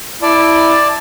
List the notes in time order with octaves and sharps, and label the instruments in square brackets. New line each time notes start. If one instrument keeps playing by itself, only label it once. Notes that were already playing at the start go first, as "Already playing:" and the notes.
[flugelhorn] E4 [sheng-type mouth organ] D5 A5